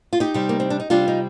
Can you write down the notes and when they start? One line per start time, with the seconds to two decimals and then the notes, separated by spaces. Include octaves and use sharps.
0.13 F4
0.20 D#4 G4
0.34 C3 G3
0.49 A#3
0.60 C4
0.70 D4
0.80 D#4
0.90 C3 G3 D4 F4
1.08 D#4